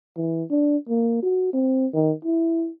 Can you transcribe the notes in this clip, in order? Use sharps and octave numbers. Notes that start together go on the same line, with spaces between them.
E3
D4
A#3
F#4
C4
D#3
E4